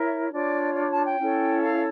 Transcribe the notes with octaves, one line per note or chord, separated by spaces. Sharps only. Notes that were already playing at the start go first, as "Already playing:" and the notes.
Already playing: E4 A#4 C#5 E5
D4 F4 C#5 D5
D5
A5
G5
C#4 E4 A4 C#5
F5